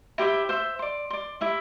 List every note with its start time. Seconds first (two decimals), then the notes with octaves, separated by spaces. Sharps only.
0.18 E4 G4 C5 E5
0.49 C5 E5 C6
0.79 D5 C6
1.10 D5 C6
1.41 E4 G4 E5